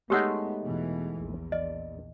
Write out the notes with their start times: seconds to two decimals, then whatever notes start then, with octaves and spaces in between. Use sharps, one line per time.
0.10 G#3 A3 B3 D#4 G4 C#5 F#5
0.61 E2 B2 E3
1.16 A#1 E2
1.52 D5 D#5